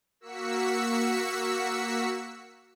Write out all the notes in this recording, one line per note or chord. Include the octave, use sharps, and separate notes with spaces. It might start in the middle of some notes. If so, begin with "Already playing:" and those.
A#3 F#4 E6 B6 C#7